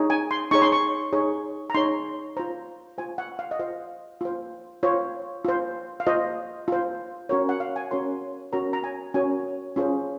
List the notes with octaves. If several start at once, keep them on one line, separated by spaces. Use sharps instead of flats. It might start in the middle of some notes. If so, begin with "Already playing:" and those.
Already playing: D#4 G#4 C#5
G#5
C6
D#4 G#4 C#5 C#6
C6
C#6
D#4 G#4 C#5
A#5
D#4 G#4 C#5 C6
F4 C5 A#5
F4 C5 G#5
F#5
F5
D#5
F4 C5 F5
F4 C5
F4 C5 C#5
F4 C5
F5
F4 C5 D#5
F4 C5
C#4 F#4 A#4 C#5
F#5
F5
G#5
C#4 F#4 A#4 C#5 C6
C#4 F#4 A#4 C#5 A#5
A#5
G#5
C#4 F#4 A#4 C#5 G#5
C#4 F4 G#4 C5